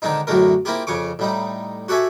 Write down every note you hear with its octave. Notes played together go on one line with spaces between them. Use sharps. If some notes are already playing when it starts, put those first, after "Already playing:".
D3 D#3 G#3 C4 D#4
F#2 A2 D3 G#3 A3 A#4
A#3 C4 E4 F4 G4 G#4
F2 C#3 G#5 C#6 D6
A2 G3 D#4
F#4 G4 A4 C#5 E5 G#5